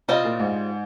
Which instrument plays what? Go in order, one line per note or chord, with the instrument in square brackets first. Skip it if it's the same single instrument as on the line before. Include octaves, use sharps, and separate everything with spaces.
[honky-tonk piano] C3 [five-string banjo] G3 C4 F4 C5 D#5
[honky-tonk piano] A#2
G#2